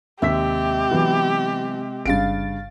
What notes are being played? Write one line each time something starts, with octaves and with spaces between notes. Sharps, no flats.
D#2 C3 G#3 C4 G4 E5 E6 B6
E3 F#3 B3
G1 G2 C#3 F5 A6 D7